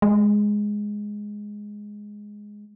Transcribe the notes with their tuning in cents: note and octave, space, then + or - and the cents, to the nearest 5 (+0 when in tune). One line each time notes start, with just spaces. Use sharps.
G#3 +0